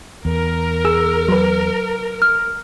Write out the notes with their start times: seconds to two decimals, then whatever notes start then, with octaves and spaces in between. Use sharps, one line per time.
0.25 E2 A#4
0.85 G#4 E6
1.28 F#3 B4
2.22 F6